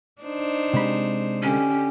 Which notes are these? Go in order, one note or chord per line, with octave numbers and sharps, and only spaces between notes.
D4 D#4 C5
C3 G#3 B5
D3 C#4 G4